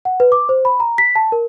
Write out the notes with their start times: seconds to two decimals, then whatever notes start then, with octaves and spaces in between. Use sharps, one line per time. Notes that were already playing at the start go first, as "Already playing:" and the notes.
0.05 F#5
0.20 B4
0.32 D6
0.49 C5
0.65 B5
0.80 A#5
0.98 B6
1.15 A5
1.32 A#4